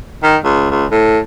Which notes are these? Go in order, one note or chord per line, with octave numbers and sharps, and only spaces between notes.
D#3
C#2
C#2
A2